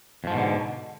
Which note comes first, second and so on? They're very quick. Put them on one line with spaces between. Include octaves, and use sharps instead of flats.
F2 F3 G#2 B2 D3